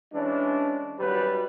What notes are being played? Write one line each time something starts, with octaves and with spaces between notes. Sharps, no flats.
E3 G#3 C#4 D4
G#1 F#2 F#3 G3 B4